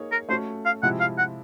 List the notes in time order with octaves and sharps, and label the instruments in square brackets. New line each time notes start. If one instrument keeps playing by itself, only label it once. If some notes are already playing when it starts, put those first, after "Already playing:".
Already playing: [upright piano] A#3 D#4 G#4 C#5
[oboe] A#4
[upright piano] A3 C#4 F#4 [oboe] C5
[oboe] F5
[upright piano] C3 F3 G#3 C4 E4 [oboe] F#5
[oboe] F5
F#5